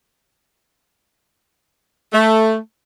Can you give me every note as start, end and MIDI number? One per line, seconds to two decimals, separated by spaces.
2.13 2.56 57